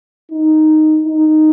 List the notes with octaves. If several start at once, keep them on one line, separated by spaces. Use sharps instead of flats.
D#4
D#4